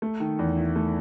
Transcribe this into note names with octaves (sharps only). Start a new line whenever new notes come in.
A3
D#3
E2
E4
A3